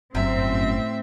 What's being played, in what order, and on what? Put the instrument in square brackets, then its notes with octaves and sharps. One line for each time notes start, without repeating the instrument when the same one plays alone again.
[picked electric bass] G1 [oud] F#2 [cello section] A2 C4 [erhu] E5